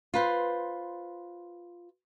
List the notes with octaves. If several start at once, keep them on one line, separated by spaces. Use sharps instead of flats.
F4 B4 C5